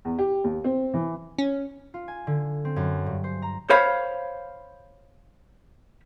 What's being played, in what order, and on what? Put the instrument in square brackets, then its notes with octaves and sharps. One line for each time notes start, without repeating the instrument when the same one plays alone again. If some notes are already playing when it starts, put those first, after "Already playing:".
[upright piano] E2
G4
D#2
C4
E3
[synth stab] C#4
[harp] F4
G#5
D3
C4
F#2
G2
C5
A#5
[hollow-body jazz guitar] C5 C#5 F5 B5